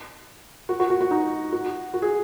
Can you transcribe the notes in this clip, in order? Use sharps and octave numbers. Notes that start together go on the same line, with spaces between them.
F#4
F#4
F#4
F#4
D#4
F#4
F#4
G#4